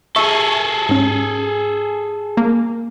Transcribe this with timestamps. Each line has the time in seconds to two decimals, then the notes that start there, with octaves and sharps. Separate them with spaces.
0.16 G#4 A4 E5 C#6
0.89 G#2 C#4
2.37 A#3